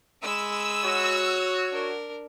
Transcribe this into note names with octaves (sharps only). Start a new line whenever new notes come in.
G#3 B5 E6
F#4 C#5
D4 A#4